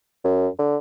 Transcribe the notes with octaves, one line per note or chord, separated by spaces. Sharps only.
F#2
D3